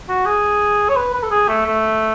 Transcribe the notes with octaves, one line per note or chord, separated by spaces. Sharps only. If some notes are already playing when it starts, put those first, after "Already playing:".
F#4
G#4
C#5
B4
B4
A4
G#4
A3
A3